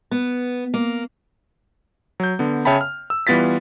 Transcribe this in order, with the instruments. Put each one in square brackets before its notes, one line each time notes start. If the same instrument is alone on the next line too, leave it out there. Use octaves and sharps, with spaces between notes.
[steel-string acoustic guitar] B3
A#3
[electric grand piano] F#3 G6
D3 B3
C#3 C#5 E5 G5 A5 B5
F6
E6
E3 G3 B3 F4 A6 B6